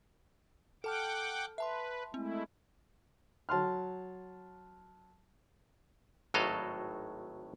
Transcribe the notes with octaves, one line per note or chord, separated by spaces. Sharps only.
A4 F#5 G5 A5 D6 F6
B4 E5 A5 C6
G#3 A3 C4 E4
F#3 A5 C6 F6
G#1 A2 F#3 A4 D#5 F5